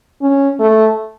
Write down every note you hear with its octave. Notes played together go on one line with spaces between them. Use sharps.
C#4
A3